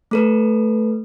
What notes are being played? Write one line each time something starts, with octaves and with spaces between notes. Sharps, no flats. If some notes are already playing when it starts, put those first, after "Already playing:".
A3 A4 B4